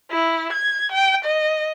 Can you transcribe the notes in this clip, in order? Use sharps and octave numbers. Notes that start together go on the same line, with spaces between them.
E4
G#6
G5
D#5